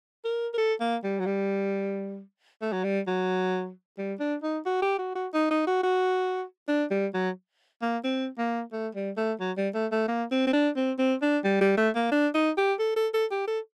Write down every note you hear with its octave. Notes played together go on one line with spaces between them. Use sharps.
A#4
A#4
A4
A#3
G3
F#3
G3
A3
F#3
G3
F#3
G3
D4
D#4
F#4
G4
F#4
F#4
D#4
D#4
F#4
F#4
D4
G3
F#3
A#3
C4
A#3
A3
G3
A3
F#3
G3
A3
A3
A#3
C4
C4
D4
C4
C4
D4
G3
G3
A3
A#3
D4
D#4
G4
A4
A4
A4
G4
A4